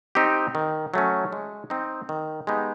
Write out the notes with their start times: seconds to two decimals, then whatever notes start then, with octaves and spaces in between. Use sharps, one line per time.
0.15 C4 D#4 G4
0.55 D#3
0.94 F#3 A3 C#4
1.32 G#3
1.70 C4 D#4
2.09 D#3
2.47 G#3 B3 D#4 G4